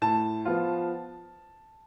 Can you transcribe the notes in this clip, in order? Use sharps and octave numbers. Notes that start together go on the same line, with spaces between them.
A2 A5
F3 B3 F4